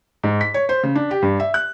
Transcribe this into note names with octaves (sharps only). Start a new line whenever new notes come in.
G#2
B6
C#5
C5
C#3
D4
G4
G2
E5
F#6